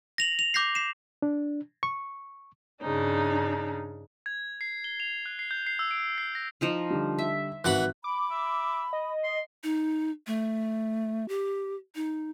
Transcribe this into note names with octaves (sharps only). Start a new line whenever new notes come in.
A#6 F7 F#7
F7
D6 G6 A#6 C7
C7 E7
D4
C#6
G2 C#3 D4 D#4
G#6
C7
G7
F7
F#6
C7
G6
C7
E6
D7
C7
A#6
F3 D#4 F4
D3 G3
E5
G#1 E3 F#4 F#5 B5 F#6
B5 D6
E5
D#5
C6
D#4
A3
G4
D#4